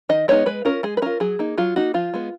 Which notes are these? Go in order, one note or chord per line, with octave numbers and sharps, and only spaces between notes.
D#3 D#5
G#3 B3 D#4 C#5
G#3 B4
C#4 F4 A#4
G#3 G#4
B4
C#4 F4 A#4
F#3 G#4
A#3 D#4
F#3 F4
A#3 D#4 F#4
F3 F4
G#3 B3